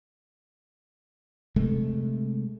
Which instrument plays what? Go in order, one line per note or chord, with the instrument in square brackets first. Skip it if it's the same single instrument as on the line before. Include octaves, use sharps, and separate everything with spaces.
[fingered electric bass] C3 G#3 A3